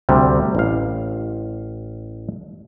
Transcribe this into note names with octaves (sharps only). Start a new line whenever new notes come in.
D2 C3 G3
A1 F5